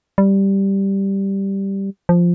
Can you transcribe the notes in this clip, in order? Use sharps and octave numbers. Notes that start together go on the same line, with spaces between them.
G3
F3